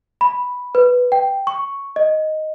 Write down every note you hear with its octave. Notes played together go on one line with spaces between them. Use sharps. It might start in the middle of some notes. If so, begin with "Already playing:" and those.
B5
B4
G5
C#6
D#5